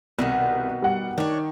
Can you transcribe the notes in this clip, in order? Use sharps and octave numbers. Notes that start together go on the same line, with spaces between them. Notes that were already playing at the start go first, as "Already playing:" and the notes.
C2 B2 D#3 B3
G3 F#5
D#3 D4 C#5